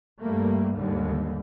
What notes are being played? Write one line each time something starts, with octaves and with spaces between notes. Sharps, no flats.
G2 G3 A3 A#3
D#2 G#2 D3 G3